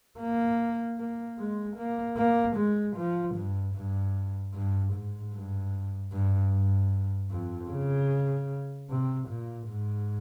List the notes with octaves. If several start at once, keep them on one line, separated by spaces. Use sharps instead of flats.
A#3
A#3
G#3
A#3
A#3
G#3
F3
G2
G2
G2
G#2
G2
G2
G2
F2
C#3
C3
A#2
G#2